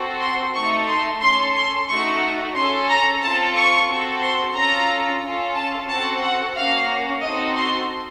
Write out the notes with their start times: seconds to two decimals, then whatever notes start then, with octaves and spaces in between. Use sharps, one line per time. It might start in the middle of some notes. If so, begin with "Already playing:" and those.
Already playing: C4 F#4 A4
0.21 C6
0.55 A3 D#4 A4 C#6
0.88 C6
1.22 C#4 A4 C6
1.56 C6
1.88 A3 D#4 F#4 A4 C#6
2.55 C#4 A4 C6
2.89 A#5
3.22 C4 F4 A4 A5
3.56 C#6
3.89 C4 F#4 A4
4.22 C6
4.55 C#4 F4 A4 A#5
5.23 C#4 F4 A4
5.56 A5
5.89 C4 F#4 A4 A5
6.22 F#5
6.56 A#3 C#4 F#4 F5
7.22 C4 D#4 F#4 A4 D#5
7.56 C6